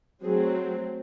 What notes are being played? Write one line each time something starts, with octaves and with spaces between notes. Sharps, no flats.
F#3 A3 C4 G#4